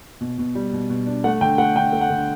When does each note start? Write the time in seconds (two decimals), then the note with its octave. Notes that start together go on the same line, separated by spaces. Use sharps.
0.21 B2
0.38 B2
0.55 G3
0.73 B2
0.90 B2
1.06 D4
1.24 A3 F#5
1.41 D3 G5
1.58 A3 F#5
1.75 D3 G5
1.93 A3
2.01 F#5
2.10 D3